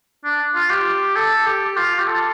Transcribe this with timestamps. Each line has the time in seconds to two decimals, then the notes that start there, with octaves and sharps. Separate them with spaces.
0.24 D4
0.55 F4
0.70 G4
1.16 A4
1.47 G4
1.77 F4
1.99 G4
2.07 A4